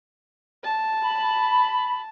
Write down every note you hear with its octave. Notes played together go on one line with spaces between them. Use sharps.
A5
B5